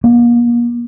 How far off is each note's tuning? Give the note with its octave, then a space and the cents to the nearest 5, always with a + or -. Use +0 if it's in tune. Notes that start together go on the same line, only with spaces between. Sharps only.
A#3 +40